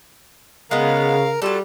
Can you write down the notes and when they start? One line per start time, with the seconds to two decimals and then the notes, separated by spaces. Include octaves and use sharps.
0.71 C#3 G#3 B3 A#4 F5
1.42 F#3 G3 F4 A4